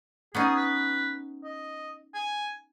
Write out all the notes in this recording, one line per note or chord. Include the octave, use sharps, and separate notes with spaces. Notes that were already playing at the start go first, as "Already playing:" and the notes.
B3 C#4 D#4 G#4
B4
D#5
G#5